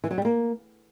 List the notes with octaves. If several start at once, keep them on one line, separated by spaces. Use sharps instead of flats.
E3
F#3
G3
A#3